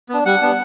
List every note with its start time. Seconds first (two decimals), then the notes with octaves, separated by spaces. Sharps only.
0.09 B3 D4
0.25 G3 F#5
0.41 B3 D4